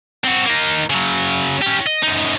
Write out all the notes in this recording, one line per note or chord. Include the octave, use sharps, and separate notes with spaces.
C4 F#4
A#3 D#4
C#3 F#3
C#4 G4
D#5
F#2 D#4